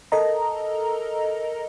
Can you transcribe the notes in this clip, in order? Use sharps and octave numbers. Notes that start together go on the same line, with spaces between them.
A4 A#4 D#5 A#5